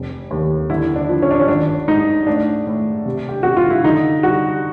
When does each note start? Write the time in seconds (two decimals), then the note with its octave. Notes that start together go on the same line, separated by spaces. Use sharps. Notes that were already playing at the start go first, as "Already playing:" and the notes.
Already playing: F1
0.31 D#2
0.70 D3 E4
0.96 D4
1.09 F3
1.22 C#4
1.31 D4
1.40 C#4
1.48 G#1 D4
1.88 G#2 D#4
2.26 A2 D4
2.67 A2
3.06 C3
3.29 G4
3.43 C3 F#4
3.57 F4
3.70 E4
3.84 D3 D#4
4.23 G3 F#4